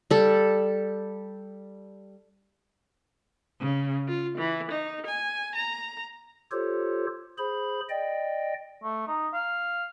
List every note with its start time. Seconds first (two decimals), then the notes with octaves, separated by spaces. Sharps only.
0.10 G3 A4
3.60 C#3
4.08 F4
4.37 E3
4.71 D#4
5.07 G#5
5.55 A#5
6.51 F4 G4 A4 C5 C#5
7.38 G#4 C5 B5
7.89 D5 D#5 G5
8.83 A3
9.08 D#4
9.33 F5